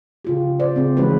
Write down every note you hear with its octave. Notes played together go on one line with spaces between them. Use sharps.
C#3 F4 G4
C5 D5
C#3 C4
E3 G#3 C#4 D#4 F#4 B4